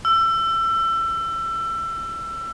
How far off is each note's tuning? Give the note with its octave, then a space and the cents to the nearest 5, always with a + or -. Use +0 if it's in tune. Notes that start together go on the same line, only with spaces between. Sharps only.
E6 +25